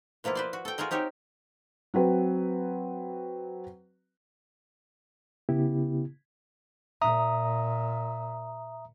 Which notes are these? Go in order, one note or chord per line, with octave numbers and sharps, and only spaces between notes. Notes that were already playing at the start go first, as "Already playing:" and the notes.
B2 F3 A#3 E4 F4
B4 C5 D5
F#4
A4 G5
F4 F#4 G#4 A#4 D#5
C4 D#4 G4 A#4 C#5
F#3 C4 B4
C#3 B3 E4 G4
A#2 E5 A#5 D#6